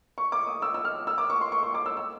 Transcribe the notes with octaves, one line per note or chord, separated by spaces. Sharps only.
C#6
D6
D#6
E6
E6
F6
E6
D6
C#6
C6
C#6
C#6
D6
E6
E6